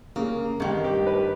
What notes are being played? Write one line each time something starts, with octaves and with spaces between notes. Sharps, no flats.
C#3 A#3
C2 G2 D#3
G4
G4 B4